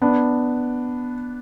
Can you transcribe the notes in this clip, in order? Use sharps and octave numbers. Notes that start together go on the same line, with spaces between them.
B3 D4